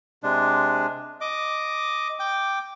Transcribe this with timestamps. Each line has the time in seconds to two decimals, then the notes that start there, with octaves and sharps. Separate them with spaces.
0.23 C3 G#3 D4
1.21 D#5 D6
2.19 G5 D6